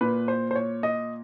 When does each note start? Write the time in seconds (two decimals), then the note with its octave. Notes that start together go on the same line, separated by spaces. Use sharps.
0.01 A#2 B4
0.28 C5
0.51 C5
0.56 C#5
0.83 D#5